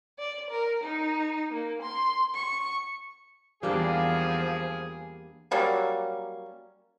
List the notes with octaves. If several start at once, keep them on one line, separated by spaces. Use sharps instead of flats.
D5
A#4
D#4
A#3
C6
C#6
E2 F3 G3 A#3 D4 G#4
F#3 G3 A#3 C#4